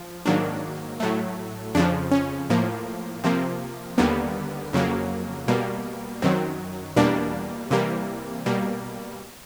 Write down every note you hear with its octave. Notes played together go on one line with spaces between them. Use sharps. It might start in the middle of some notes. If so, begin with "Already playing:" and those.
Already playing: F3
G#2 D#3 F#3 A#3 D4
A2 F#3 A3
F2 C#3 F3 D4
C#4
A2 F3 A#3
C3 F3 A#3 C4
D#2 D3 G3 A#3 B3
F2 C#3 F#3 A#3
B2 G3 A#3
F#2 D#3 F#3 C4
E2 B2 G3 A#3 D4
C3 E3 G3 A#3
B2 G3 A#3